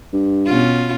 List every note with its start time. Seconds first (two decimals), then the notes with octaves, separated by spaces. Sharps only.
0.13 G2
0.46 B2 C#4 F4